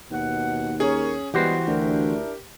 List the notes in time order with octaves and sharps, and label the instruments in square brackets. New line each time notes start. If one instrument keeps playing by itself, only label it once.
[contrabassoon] D#2 [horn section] B2 F#5
[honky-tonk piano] C#4 G#4 [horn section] A#4 C#5
[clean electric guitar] E3 F#4 C5 [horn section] G3 G#3 B3 [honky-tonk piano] G4
[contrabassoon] D2 [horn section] D4 E4 A#4